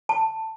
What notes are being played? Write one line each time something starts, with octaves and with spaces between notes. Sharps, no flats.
A5